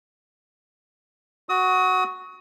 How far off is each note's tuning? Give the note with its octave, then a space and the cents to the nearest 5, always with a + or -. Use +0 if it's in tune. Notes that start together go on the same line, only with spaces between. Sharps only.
F#4 +0 D#6 +35